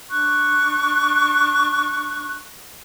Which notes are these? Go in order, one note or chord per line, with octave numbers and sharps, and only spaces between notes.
D4 C#6 F#6